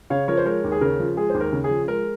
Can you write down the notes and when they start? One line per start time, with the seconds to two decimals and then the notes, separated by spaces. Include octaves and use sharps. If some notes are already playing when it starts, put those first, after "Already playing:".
0.10 C#3 C#5 F5
0.28 F3 A#4 C#5
0.37 C5
0.46 G#3 A#4 C#5
0.64 D#2
0.72 G#4
0.81 C#3 A#4
1.00 F3
1.17 G#3 G#4
1.29 D#2 C5
1.40 A#4
1.52 C#3
1.64 G#4
1.70 F3
1.88 G#3 A#4